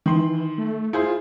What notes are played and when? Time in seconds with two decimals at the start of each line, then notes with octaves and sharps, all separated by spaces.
0.06 D#3 E3 C6
0.58 A3
0.93 E4 F4 G#4 C5